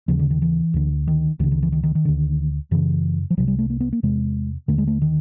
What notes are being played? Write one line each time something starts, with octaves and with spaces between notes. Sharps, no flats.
D#2 C#3 F3
D3
D#3
E3
D2 D3
D#3
C#2 C#3 D#3
D#3
E3
D#3
D#3
D#3
D2 D3
F#2 C#3 E3
F3
C2 C3 F#3
G3
A3
A#3
B3
A#3
E2 C3 G#3
D#2 D3 A3
G#3
A3
D#3